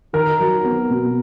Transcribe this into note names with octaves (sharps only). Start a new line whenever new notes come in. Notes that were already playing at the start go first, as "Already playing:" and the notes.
D#3 A#4
F#3
B3
B2